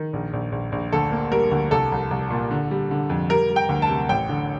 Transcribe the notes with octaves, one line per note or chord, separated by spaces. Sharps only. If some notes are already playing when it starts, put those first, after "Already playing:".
Already playing: D#3
A#1
A#1
A#1
A#1
D2 A4
A#3
G3 A#4
D2
C2 A4
C2
C2
A#2
D3
G3
D3
F2
G3 A#4
G3
G5
D2
A5
C3
A1 G5
D3